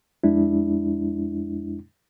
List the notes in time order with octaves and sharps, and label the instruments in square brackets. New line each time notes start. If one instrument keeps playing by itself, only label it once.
[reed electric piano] F2 G#3 D4 E4